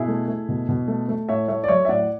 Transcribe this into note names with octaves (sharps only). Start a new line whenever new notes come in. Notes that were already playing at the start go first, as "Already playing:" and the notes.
Already playing: B2 E4 G#4
A3
A3
B2
B2
A3
A3
A2 C#5 E5
A3 C#5 E5
D5
F#3 C#5 E5
E5
A2 D5 F#5